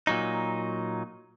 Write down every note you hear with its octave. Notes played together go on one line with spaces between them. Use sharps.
A#2 F#3 D#4